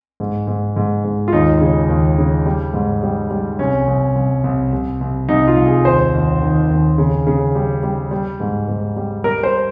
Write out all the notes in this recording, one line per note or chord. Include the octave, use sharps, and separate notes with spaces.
G#2
G#2
G#2
G#2
F4
D#2 D#4
C#3
D#2
C#3
G3
G#2
G3
G3
C2 C#4
C2
C2
C2
C2
C2
C2 D#4
F4
C2
G#4
D#2 C5
D#2
D#3
D#2
C#3
C#3
G3
G3
G3
G#2
G#2
G3
G3 A#4
C5